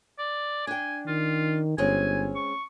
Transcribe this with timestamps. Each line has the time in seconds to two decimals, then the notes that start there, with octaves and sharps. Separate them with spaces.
0.18 D5
0.67 D4 G5 G#5
1.07 D#3 F4
1.78 G1 G#3 C4 C#4 G#5
2.35 C#6